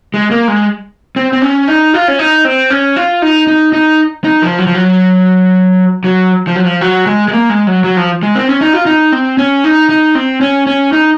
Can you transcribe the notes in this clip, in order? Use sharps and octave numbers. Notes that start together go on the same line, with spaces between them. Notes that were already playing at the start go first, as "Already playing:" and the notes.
G#3
A#3
G#3
C4
C4
C#4
D#4
F4
C#4
D#4
C4
C#4
F4
D#4
D#4
D#4
D#4
F3
F#3
F3
F#3
F#3
F3
F#3
F3
F#3
G#3
G#3
A#3
G#3
F#3
F#3
F3
G#3
C4
C#4
D#4
F4
D#4
C4
C#4
D#4
D#4
C4
C#4
C#4
D#4